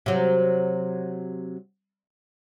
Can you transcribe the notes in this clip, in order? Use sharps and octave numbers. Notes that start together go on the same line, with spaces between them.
C3 F#3